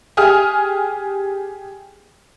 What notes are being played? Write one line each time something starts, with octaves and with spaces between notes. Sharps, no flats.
G4 G#4 G#5 D#6 F6